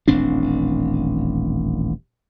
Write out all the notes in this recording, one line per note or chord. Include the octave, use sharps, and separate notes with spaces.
D#1 A1 C4 D4